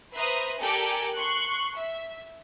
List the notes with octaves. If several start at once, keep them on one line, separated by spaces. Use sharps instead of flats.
B4 C5 E5 A#5 D#6
G4 A4 A#4 D5 G5 G#5
C6 C#6 F#6
E5